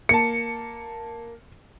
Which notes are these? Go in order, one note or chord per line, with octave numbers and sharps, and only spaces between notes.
A#3 A5 C#7